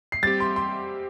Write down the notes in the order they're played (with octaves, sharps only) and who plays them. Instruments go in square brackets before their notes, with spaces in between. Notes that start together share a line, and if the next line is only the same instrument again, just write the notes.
[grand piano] C7
[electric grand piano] G3 C4 G4 [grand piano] A6
[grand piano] C6
C6